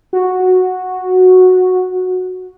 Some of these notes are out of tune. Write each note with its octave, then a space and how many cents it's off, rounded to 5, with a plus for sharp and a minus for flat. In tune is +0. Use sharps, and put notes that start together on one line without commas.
F#4 -5